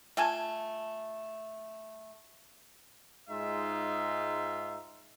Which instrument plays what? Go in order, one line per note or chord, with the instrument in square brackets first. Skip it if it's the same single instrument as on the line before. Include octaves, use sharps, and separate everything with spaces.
[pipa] A3 F4 G#5 A5
[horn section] G#2 G#3 D#4 F4 E5